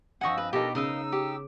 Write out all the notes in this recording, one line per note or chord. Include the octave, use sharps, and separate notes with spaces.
G2 F3 C4 D#5 F#5 G#5 C#6 E6
B4
B2 D4 D#4 G4 A4 A#4
C#3 D#4 A#4 D#5 F5 E6
G4